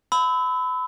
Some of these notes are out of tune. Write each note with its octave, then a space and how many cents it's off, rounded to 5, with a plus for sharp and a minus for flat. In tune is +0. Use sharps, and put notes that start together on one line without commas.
B5 +30 E6 -25